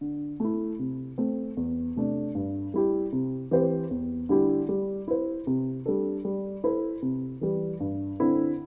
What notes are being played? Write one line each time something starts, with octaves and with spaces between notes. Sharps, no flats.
D3
A3 E4
C3
A3 C4
E2
C3 A3 D4
G2
G3 E4 G4
C3
E3 C4 G4 C5
E2
D3 G3 E4 G4
G3
E4 C5
C3
G3 D4 A4
G3
E4 A4 C5
C3
E3 G3
G2
D3 C4 E4 A4